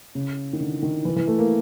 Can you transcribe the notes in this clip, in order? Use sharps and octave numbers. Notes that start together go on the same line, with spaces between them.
C#3
D#3
D3
D#3
E3
E3
A3
A#3